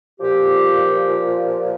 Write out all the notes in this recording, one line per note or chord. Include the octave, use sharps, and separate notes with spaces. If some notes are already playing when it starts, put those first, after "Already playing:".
A#2 F3 G4